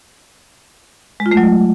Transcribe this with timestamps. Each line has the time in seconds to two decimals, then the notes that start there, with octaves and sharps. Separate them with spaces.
1.20 G#3
1.26 F4
1.31 A3
1.37 F#3